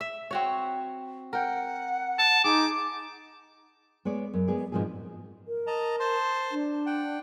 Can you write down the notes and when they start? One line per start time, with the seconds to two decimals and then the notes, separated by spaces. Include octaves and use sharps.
0.01 E5
0.31 C4 F#4 C#5
1.33 A#4 F#5 G5
2.19 A5
2.44 D#4 G#4 D6
4.05 G#3 B3 C#5 D5
4.34 F#2
4.48 G#3 B3 G#4 D5
4.72 G#2 B2 F3 C4 G#4
5.48 A#4
5.67 D#5 A5 A#5
6.00 C5 A5 C6
6.52 D4
6.86 F#5 G5